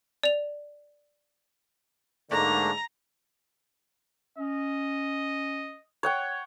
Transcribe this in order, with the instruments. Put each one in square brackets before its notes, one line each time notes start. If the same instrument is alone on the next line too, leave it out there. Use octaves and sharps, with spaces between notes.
[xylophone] D5 F7
[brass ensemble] G#2 D3 [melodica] A3 A#3 D4 [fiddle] A#5
[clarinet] C#4 [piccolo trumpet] D#5
[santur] C#5 F#5 G5